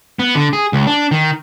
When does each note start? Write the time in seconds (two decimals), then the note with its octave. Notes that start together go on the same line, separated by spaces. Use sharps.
0.19 B3
0.35 D3
0.53 G#4
0.73 C#2
0.87 D4
1.11 D#3